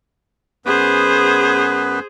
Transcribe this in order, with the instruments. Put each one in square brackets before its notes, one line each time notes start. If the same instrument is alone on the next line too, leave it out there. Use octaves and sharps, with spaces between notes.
[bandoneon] F#2 B3 B4 [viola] G#4 C5